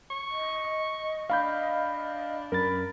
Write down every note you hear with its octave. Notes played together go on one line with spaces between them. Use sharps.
C#6
D#5
D4 F5 B5 G6
F#2 A#4 B5 A6